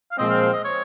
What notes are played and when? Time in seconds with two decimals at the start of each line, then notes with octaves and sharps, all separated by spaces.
0.12 F5
0.18 A#2 F3 G#3 C4 D#5
0.30 F5
0.41 F5
0.53 D#5
0.64 C#5